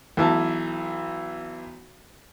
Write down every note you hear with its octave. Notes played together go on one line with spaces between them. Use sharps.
B1 E3 A5